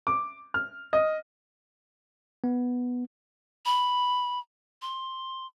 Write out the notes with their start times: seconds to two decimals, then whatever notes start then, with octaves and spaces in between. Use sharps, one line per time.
0.07 D6
0.54 F6
0.93 D#5
2.44 B3
3.65 B5
4.82 C6